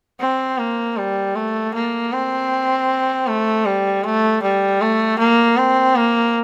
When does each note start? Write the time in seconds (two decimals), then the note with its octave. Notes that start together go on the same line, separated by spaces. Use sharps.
0.20 C4
0.58 A#3
0.97 G3
1.36 A3
1.74 A#3
2.12 C4
3.27 A3
3.66 G3
4.04 A3
4.42 G3
4.81 A3
5.19 A#3
5.57 C4
5.96 A#3